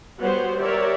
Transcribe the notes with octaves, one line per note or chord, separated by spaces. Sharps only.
G3 B3 F#4 C5 C#5 F#5
G4 A#4 C#5 D5 E5